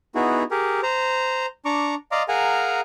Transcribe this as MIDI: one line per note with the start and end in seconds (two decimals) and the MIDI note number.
0.15 0.43 59
0.15 0.43 63
0.15 0.43 64
0.15 0.43 66
0.15 0.43 68
0.51 0.81 67
0.51 0.81 68
0.51 0.81 70
0.83 1.46 72
0.83 1.46 82
1.65 1.95 62
1.65 1.95 82
1.65 1.95 85
1.65 1.95 86
2.12 2.23 74
2.12 2.23 75
2.12 2.23 77
2.12 2.23 82
2.12 2.23 84
2.12 2.23 86
2.28 2.80 68
2.28 2.80 70
2.28 2.80 77
2.28 2.80 78
2.28 2.80 80
2.28 2.80 82